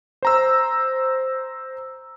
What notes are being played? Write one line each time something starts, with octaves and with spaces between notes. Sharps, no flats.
C5 A#5 E6